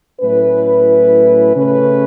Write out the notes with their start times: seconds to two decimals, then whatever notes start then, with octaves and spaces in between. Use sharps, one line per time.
0.21 A2 F#3 A3 C#4 E4 B4
1.55 C#3 A3 C#4 B4